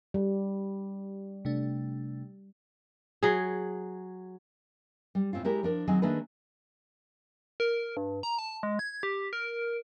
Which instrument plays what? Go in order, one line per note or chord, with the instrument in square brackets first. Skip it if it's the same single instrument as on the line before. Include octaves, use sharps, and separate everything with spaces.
[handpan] G3
[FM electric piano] C3 A3 D4
[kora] F#3 G#4
[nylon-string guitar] G3
A2 C4 C#4 F4
G#3 E4 G4 A#4 D5
F3 D4 A#4
D#3 F#3 C4 G#4 D#5 G#5
D#3 A3 A#3 D4 G#4 B4
[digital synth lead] A#4
G2
A#5
A5
G#3
G#6
G4
A#4